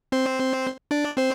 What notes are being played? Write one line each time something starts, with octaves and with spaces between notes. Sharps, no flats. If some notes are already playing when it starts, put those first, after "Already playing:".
C4 C5
D4 D5
C4 C5